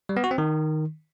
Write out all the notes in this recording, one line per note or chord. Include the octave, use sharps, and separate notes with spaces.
G3
B3
F#4
C4
D#3